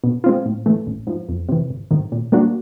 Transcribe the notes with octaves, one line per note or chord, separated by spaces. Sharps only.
B2
G#3 C4 F4
A2
E3 A3
A1
G#2 F3
F2
C3 E3
G#1
G#2 D#3
A#2
G3 A#3 D4 F#4